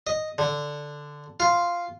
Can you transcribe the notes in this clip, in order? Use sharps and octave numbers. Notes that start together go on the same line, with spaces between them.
D#5
D3
F4